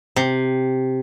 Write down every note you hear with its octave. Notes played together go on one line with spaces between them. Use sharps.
C3